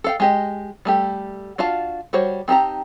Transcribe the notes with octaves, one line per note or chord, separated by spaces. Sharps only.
A4 F5 G5
G#3 G4 D#5
G3 A3 G4
D4 F4 F#4 F5 A5
G3 F#4 C5 C#5
C4 D#4 G4 A5 A#5